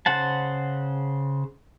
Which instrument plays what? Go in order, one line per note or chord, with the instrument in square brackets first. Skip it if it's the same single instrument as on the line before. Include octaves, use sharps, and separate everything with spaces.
[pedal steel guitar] C#3 C5 F#5 A5